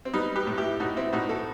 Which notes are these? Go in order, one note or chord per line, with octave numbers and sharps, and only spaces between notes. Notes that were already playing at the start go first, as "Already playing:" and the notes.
C4
G3 B3 D#4
G4 B4
A2
E4 G4
A2 D#4 F#4
C4 E4
A2 D#4 F#4
F#4 A4